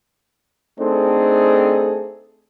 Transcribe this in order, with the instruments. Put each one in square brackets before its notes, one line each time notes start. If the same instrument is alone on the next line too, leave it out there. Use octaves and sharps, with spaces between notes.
[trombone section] A3 C4 D4 D#4 G#4 A4